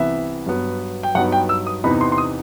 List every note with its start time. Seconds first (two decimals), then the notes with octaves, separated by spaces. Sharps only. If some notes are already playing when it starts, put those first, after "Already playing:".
Already playing: C2 C3 E3 B3 E5
0.46 G2 F#3 B3
1.03 G5
1.15 G2 F#3 B3 D#4 F#5
1.32 G5
1.49 E6
1.67 D#6
1.84 E2 C3 E3 B3 D#4 B5
2.01 C6
2.12 C6
2.18 D#6